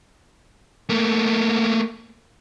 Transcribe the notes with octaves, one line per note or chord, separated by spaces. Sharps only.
A3 A#3